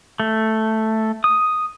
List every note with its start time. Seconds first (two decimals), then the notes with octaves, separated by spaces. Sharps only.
0.20 A3
1.24 D#6